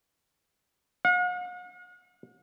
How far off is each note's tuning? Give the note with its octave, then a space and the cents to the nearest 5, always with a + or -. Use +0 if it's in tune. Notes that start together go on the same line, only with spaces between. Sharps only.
F#5 -45